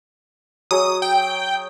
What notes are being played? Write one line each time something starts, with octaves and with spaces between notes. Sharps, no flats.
F#3 G#4 D#5 D#6
G5